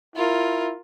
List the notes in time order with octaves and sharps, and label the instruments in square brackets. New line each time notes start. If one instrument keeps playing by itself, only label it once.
[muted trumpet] E4 [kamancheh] F4 A#4